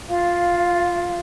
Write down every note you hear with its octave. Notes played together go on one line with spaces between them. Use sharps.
F4 F5